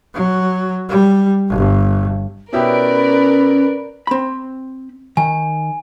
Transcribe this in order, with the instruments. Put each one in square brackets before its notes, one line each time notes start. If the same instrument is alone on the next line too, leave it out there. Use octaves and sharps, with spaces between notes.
[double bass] F#3
G3
G1
[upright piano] B2 E4 G4 [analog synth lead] C#4 [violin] A#4 D5 [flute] B4
[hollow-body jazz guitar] C4 B5
[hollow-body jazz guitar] D#3 [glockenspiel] G#5